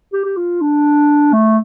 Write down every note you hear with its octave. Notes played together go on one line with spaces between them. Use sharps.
G4
G4
F4
D4
A3